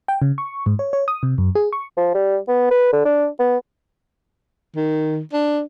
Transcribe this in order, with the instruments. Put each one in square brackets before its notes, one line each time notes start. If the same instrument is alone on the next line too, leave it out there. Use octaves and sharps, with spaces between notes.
[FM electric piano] G5
C#3
C#6
G#2
C#5
C#5
D#6
C3
F#2
G#4
C#6
[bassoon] F3
G3
B3
B4
D3
D4
B3
[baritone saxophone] D#3
D4